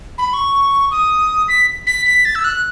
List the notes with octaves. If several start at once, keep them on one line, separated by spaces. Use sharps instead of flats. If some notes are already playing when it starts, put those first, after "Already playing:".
B5
C#6
D#6
B6
B6
B6
A6
E6
F#6